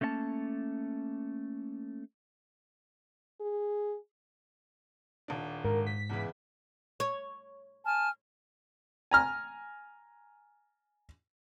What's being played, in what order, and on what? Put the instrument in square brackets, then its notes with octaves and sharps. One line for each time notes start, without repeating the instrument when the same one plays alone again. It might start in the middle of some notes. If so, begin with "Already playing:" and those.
[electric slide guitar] A3 A#3 C#4 D5 A5
[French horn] G#4
[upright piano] D#1 D4
[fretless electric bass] G#2 [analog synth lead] A#4
[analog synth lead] B6
[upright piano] E2 C#3 E3
[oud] C#5
[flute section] G#5 A5 F6
[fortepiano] G#5 A#5 F6